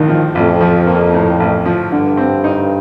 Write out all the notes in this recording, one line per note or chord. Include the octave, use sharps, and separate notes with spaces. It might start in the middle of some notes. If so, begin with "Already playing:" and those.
Already playing: A#1 A2 D#3
F3
A1 F2
F3
A#3
A2
A1
F3
G2 D3
C4
D#4